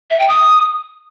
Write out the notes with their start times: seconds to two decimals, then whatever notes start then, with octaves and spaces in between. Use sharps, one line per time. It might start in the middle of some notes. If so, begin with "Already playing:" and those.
0.10 E5
0.19 G5
0.28 D#6